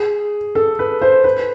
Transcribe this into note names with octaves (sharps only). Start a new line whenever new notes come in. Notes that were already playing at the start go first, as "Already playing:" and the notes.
Already playing: G#4
A4
B4
C5
B4